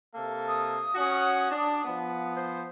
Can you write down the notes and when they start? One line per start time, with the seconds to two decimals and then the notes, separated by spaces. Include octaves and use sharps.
0.15 C3 A#3 A4
0.47 D#6
0.95 C#4 F#4 F#5
1.52 D4
1.85 F3 B3
2.35 C5